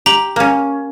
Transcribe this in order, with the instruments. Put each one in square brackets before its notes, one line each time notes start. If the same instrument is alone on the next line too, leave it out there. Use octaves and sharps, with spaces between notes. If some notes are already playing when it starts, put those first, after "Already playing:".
[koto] G4 [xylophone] A#5 F#7
[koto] A#3 C#4